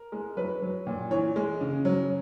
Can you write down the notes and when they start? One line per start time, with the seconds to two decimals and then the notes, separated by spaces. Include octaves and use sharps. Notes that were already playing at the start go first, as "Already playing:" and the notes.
Already playing: A#4
0.12 G#3
0.37 F#3 B4
0.62 F#3
0.87 A#2
1.11 E3 C#5
1.36 G#3
1.61 C#3
1.85 F#3